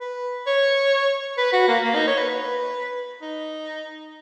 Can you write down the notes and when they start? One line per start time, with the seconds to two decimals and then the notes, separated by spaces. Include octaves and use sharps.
0.01 B4
0.47 C#5
1.37 B4
1.53 F#4
1.68 A#3
1.84 A#3
1.95 D#4
2.07 C#5
2.18 B4
2.29 B4
3.21 D#4